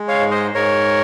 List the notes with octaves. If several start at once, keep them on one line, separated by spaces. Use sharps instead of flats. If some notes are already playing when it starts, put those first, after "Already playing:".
Already playing: G#3
C#5 F5
G#2
C5 D#5
G#2 A#4 C#5